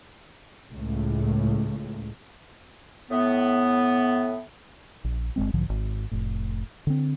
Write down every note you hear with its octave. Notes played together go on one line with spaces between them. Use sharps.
C#2 A2
A2 B3
A#1
G1 E2 G#3 C4
B1 G#2 D3 F3
G#1
F1 A2
D3 C4